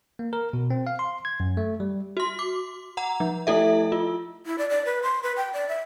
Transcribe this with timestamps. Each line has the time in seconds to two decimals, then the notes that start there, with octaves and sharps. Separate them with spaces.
0.19 A#3
0.33 A#4
0.53 B2
0.70 C4
0.87 F5
0.99 C6
1.25 G#6
1.40 F#2
1.57 A3
1.80 G3
2.17 F#4 C6
2.39 D6
2.97 F#5 A#5
3.20 F3
3.47 A3 E4 A4 E5
3.92 F4
4.46 E4
4.58 D5
4.70 D5
4.85 B4
5.03 C6
5.23 B4
5.36 G5
5.53 D5
5.68 E5